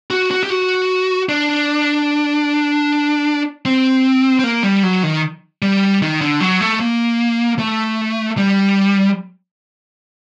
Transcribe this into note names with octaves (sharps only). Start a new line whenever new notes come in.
F#4
F#4
G4
F#4
D4
C4
C4
A#3
G3
F#3
D#3
G3
D#3
D3
F#3
A3
A#3
A3
G3